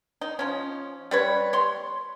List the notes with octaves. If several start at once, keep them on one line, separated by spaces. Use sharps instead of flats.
D#4
F3 C#4
G3 B4 C#5
C#5 C6